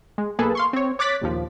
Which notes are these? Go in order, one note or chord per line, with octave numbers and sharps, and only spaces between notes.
G#3
B1 A#3 G#4 A4 B4
F5 C6 C#6
C4 C#5
C#5 D6 F#6 A6 B6
A#1 D#2 F3